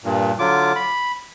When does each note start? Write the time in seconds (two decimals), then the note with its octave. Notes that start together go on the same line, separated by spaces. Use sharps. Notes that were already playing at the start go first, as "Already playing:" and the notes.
0.04 G2 A#2
0.39 D3 F#3 F4 D6
0.75 B5